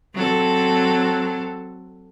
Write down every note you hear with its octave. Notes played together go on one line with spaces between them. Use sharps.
F#3 C4 A4